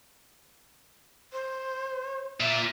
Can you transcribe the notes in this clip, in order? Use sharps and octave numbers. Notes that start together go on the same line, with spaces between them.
C5
A#2 E5